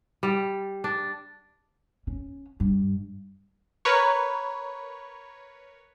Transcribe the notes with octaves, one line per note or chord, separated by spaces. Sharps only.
G3
D4
C#4
G2
A#4 B4 C#5